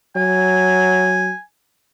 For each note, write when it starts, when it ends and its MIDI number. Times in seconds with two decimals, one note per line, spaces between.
0.16 1.31 54
0.16 1.41 80